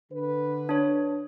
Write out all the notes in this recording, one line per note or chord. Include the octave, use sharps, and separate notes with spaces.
D3 B4
D4 C#5